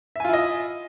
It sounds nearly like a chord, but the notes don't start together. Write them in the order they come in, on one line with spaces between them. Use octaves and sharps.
E5 G#5 F4 E4 D#5